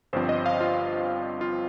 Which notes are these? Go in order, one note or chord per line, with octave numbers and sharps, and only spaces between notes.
G1 G2 F3 C4 C5
D#5
F5
F4
F4